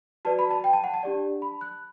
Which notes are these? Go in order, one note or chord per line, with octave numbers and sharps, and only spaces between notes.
F#4 B4 D5 A5
B5
A5
G5
A5
F#5
A5
D4 G4 D5
B5
F#6